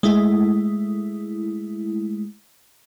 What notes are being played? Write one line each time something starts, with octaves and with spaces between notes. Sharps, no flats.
G#3 A3 E4